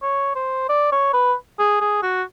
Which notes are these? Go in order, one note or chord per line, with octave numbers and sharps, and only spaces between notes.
C#5
C5
D5
C#5
B4
G#4
G#4
F#4